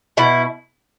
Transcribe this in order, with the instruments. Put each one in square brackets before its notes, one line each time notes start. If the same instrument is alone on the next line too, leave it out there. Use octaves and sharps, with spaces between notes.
[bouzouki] B2 E4